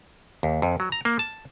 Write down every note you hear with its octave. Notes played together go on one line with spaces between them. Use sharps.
D#2
F2
F#3
A#5
A#3
A5